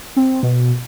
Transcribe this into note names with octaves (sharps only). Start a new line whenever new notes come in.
C4
B2